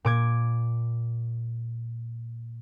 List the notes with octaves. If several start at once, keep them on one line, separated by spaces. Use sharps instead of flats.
A#2 D6 G#6